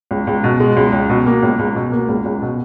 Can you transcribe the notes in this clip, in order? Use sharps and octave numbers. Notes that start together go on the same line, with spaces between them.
C#2
C#2
B2
G#3
C#2
C#2
B2
A#3
C#2
C#2
B2
A#3
C#2
C#2
B2